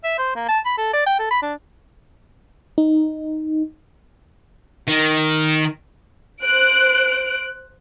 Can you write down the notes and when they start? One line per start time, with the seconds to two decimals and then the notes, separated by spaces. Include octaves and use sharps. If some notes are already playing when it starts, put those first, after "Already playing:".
0.04 E5
0.18 C5
0.35 A#3
0.49 A5
0.66 B5
0.78 A4
0.93 D5
1.06 G5
1.19 A4
1.31 B5
1.42 D4
2.78 D#4
4.88 D#3
6.41 C5 F#6 D7